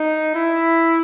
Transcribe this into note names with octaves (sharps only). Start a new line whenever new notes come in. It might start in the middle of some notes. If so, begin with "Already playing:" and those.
Already playing: D#4
E4